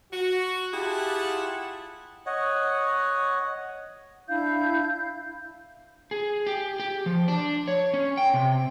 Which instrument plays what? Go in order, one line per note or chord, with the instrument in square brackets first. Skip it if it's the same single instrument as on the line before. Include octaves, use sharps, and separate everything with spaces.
[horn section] F#4
E4 F4 G4 G#4 F#5 A5
[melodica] C#5 D#5 F#5
[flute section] D4 E4 F5 G6
[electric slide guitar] G#4
G4
G4
F3
D4
C#5
C#4
G5
C3